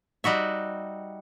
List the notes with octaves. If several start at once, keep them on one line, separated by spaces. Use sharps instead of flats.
G3 D#4 F#4 E5